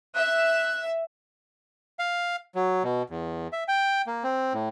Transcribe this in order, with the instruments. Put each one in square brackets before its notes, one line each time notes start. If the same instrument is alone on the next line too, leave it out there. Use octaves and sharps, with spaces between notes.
[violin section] E5 [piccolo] F#6
[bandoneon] F5
F#3
B2
E2
E5
G5
A#3
C4
A2